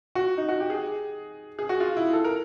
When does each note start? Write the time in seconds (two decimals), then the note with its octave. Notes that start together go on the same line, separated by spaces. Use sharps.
0.15 F#4
0.37 D#4
0.49 F#4
0.60 G4
0.70 G#4
1.59 G#4
1.69 F#4
1.80 F4
1.96 E4
2.13 A4
2.24 A#4